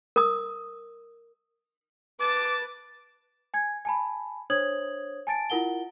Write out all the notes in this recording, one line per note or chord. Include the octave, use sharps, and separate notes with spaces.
A#4 D#6
B4 A5 D6
G#5 G#6
G#5 A5 B5
D4 C5 C#5 D#6 G#6 F#7
G#5 A5 A6 D7
E4 F4 A#4 F#5 G7